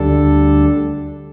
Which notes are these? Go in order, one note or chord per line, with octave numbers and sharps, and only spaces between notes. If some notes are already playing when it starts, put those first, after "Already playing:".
Already playing: D2 D3 G3 D4 A4